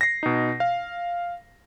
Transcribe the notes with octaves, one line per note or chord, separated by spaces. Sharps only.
A#6 C7
B2 D#4
F5